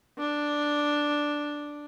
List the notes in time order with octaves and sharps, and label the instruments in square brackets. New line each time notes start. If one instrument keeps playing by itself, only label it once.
[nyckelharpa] D4